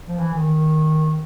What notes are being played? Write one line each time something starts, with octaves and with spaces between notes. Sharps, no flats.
F3
E3
D#3